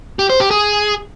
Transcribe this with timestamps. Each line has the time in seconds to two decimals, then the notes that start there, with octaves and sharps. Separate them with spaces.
0.19 G4
0.30 C5
0.40 G4
0.51 G#4